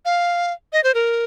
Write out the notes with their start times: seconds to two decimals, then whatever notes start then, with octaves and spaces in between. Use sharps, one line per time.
0.05 F5
0.73 D#5
0.84 C5
0.94 A#4